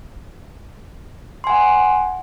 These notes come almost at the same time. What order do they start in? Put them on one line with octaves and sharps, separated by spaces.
C6 G#5 F#5